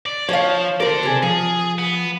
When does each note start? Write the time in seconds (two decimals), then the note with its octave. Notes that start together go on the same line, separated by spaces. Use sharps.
0.06 D5
0.29 F3 C#5 F5
0.80 A4 A#4 C5 D5
1.03 C3 G#4
1.23 F3 G#4
1.79 B3